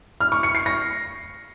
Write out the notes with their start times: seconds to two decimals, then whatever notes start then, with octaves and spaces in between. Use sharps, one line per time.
0.20 F6
0.32 C#6
0.43 C#7
0.55 C7
0.66 A#6